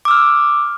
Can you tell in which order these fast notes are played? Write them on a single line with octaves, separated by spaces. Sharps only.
D6 E6 F6